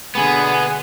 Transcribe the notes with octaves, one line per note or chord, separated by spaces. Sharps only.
B2 D3 B3 G#4